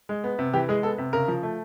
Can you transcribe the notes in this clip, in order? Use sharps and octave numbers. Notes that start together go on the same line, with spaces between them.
G#3
B3
C3
E3 G4
G#3 G#4
B3 A4
C3
C#3 A#4
F3
A3